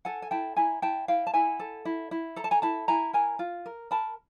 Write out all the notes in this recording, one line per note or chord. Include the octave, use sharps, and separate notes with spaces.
A4 F#5 G#5
G#5
E4 G5 A5
E4 G#5 A#5
E4 G5 A5
E4 F5 G5
A5
E4 F#5 G#5
A4
E4
E4
A4 A#5
A5
G#5 A#5
E4 A5 B5
E4 G#5 A#5
A#4 G#5 A#5
F4
A#4
A#4 A5 B5